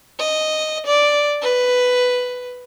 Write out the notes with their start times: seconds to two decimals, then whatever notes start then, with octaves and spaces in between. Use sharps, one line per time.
0.20 D#5
0.87 D5
1.42 B4